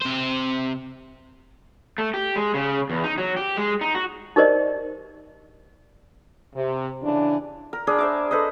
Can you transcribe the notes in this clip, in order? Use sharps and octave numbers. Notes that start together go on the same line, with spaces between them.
C3 C5
A3
G4
G#3
C#3
E2
D#4
F#3
G4
G#3
D#4
F#4
D#4 G4 A#4 C5 D5 D#5
C3
C#3 E3 D4
A#4
D4 G#4 A#4 B5
C5 E5 D6
A4 B4 C5 D#5